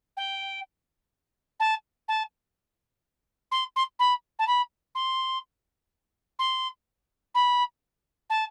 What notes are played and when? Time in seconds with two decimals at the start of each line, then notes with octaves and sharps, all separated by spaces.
0.17 G5
1.60 A5
2.08 A5
3.51 C6
3.76 C6
3.99 B5
4.39 A5
4.47 B5
4.95 C6
6.39 C6
7.35 B5
8.30 A5